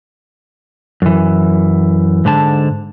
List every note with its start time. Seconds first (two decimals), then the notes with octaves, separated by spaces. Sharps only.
1.02 F#2 E3
2.25 G#2 D3 A5